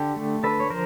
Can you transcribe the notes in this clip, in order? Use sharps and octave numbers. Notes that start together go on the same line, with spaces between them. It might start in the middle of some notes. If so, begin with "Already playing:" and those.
Already playing: D3 G4 A4
A3
D3 A4 B4
C#5
F3 A#4 C5